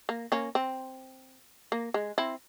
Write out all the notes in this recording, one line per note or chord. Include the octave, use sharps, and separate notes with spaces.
A#3
A#3 C#4
C4
A#3
G#3
C4 E4